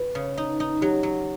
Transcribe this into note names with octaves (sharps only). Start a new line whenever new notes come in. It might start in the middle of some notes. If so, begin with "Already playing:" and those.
Already playing: B4
C#3
D#4
D#4
F#3 G4
F#3